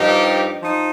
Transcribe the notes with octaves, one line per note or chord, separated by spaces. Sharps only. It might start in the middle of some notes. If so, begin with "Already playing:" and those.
Already playing: G2 F3 D#4 G4
F3 D#4